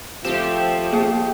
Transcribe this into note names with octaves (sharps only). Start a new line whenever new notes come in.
F3 A3 C4 G4 E7
A#3 G#4